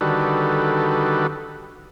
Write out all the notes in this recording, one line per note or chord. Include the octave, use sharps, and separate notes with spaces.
D3 D#3 G3 F#4 A4 B4